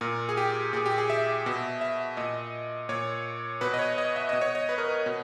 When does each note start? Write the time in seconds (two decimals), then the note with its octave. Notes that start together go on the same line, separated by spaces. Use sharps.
0.01 A#2 A#4
0.29 G#4
0.37 G4
0.73 A#2 G#4
0.86 G4
0.98 G#4
1.10 E5
1.46 B2
1.81 E5
2.17 A#2 D#5
2.89 A#2 C#5
3.61 B2 B4
3.74 D#5
3.79 C#5
3.98 D#5
4.16 E5
4.29 B2 D#5
4.41 C#5
4.55 D#5
4.69 B4
4.78 A#4
4.87 B4
5.06 B2